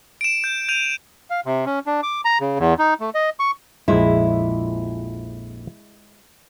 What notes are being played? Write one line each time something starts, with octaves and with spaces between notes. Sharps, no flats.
D7 E7
G6
G6 D#7 F7
F5
C3
C#4
D4
D6
A#5
C#3
E2
D#4
A3
D#5
C#6
A#1 F2 G#3 E4 C5